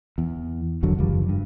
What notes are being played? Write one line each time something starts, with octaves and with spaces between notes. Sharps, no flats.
E2
F#1 F2 D3 F#3
F#1 D#2 F3 G3
G2